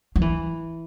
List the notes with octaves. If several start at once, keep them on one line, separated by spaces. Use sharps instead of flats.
F3
E3